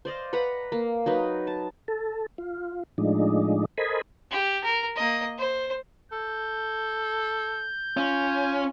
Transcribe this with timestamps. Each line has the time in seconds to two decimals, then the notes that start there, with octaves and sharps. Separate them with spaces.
0.05 C5 D5 D#5 F5
0.33 B4 F#5 A#5 B5
0.72 A#3
1.06 F#3 D#4 B4
1.47 A5
1.88 A4
2.38 F4
2.98 A2 F3 G#3 D4 D#4
3.78 A4 A#4 C5 D#5 G#5 B5
4.31 G4
4.64 A#4
4.96 A#3 D#5
5.38 C5
6.12 A4 G6
7.97 C#4 F4